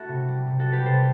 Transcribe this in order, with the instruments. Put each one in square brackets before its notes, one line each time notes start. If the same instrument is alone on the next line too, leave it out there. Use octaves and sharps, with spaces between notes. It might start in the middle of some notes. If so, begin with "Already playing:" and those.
Already playing: [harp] A3 E4 F#4 A4
C3
G3
C3
F#4 A4
G3
G4 B4
C3 A4 C5